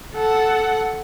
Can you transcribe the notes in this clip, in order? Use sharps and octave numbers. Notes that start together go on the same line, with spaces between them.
A4 F#5